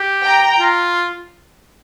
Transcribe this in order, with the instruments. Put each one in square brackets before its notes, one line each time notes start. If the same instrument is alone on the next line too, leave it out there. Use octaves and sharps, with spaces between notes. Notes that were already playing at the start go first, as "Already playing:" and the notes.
Already playing: [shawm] G4
[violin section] G5 A#5
[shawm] F4